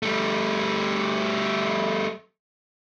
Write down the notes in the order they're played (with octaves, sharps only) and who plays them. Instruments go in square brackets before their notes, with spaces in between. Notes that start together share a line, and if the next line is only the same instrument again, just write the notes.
[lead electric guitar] G3 A3